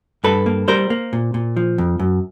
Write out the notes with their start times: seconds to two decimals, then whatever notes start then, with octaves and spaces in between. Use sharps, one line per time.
0.24 G2 A4 B4
0.46 A#3
0.68 G3 A#4 C5
0.90 A#3
1.13 A#2
1.34 A#2
1.56 F3
1.78 F2
1.99 F#2